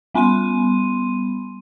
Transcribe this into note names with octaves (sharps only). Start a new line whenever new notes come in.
G3 B3 B5 C6 D#7